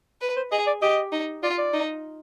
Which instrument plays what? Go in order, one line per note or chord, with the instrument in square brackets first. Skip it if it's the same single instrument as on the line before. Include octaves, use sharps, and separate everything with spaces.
[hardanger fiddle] B4
[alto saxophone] C5
[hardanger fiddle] G#4 [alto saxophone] D#5
[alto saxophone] D5
[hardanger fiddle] G4 [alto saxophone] D#5
[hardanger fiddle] D#4
[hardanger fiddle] F4 [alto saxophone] D5
[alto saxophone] D5
[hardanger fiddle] D#4